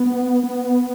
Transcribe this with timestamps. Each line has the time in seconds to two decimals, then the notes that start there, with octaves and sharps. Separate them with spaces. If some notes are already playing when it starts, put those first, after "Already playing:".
Already playing: B3
0.44 B3